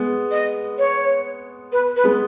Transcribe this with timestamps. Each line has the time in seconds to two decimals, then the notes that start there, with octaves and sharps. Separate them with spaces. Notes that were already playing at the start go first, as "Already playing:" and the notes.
Already playing: G#3 B3
0.31 D#5
0.78 C#5
1.72 B4
1.96 B4
2.04 G#3 B3